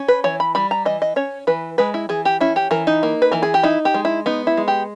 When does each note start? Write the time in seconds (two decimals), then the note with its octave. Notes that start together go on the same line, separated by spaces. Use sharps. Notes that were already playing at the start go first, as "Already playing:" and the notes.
Already playing: C#4
0.08 B4
0.24 E3 C#5
0.40 B5
0.55 G3 B5
0.71 A#5
0.85 E3 D#5
1.02 D#5
1.16 C#4 C#5
1.47 E3 B4
1.78 G#3 B4
1.94 E4
2.09 E3 G#4
2.25 G4
2.41 C#4 E4
2.56 G4
2.71 E3 A#4
2.87 D#4
3.03 A#3
3.22 B4
3.32 E3 A#4
3.43 G#4
3.54 G4
3.63 D#4 E4
3.85 G4
3.94 G#3
4.05 E4
4.26 B3 D#4
4.47 E4
4.57 G#3
4.68 G4